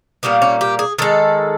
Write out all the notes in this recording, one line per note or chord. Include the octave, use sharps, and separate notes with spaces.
A#2 G3 A#3 B3
C#4
G4
G#4
D#3 G#3 A4